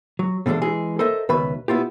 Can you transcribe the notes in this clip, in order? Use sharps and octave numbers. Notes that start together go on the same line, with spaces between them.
F#3
B2 D3 E3 G#3 D4
E3 G#3 G#4
A4 A#4 C5 D#5 E5
C#2 B2 D#3 B4 E5 B5
B3 E4 F4 G4